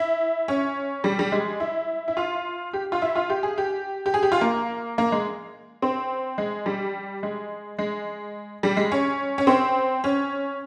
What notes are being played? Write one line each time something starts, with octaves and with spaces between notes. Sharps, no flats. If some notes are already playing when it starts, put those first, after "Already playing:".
Already playing: E4
C#4
G3
G3
G#3
E4
E4
F4
G4
F4
E4
F4
G4
G#4
G4
G4
G#4
G4
F4
A#3
A#3
G#3
C4
G#3
G3
G#3
G#3
G3
G#3
C#4
C#4
C4
C#4